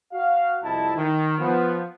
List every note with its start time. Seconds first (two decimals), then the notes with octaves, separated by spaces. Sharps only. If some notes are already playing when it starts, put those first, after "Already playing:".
0.12 F#4 F5
0.63 C2 F2 E4 D#5 A5
0.96 D#3
1.39 F3 B3